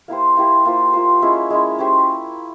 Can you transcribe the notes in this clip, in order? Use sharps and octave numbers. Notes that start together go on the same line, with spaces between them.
A#3 E4 G4 C5
A#3 E4 G4 C5
A#3 F4 C5
A#3 F4 C5
G#3 C#4 E4
G#3 C#4 E4
C#4 G4 C5 E5